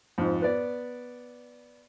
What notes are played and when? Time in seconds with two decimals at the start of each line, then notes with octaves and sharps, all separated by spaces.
0.18 F2 G#2
0.42 B3 D5